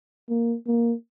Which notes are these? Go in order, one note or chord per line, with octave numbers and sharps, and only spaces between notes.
A#3
A#3